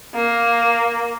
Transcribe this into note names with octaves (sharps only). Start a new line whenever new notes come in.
A#3